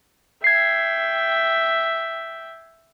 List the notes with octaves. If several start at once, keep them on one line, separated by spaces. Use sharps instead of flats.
E5 G5 G#6 C7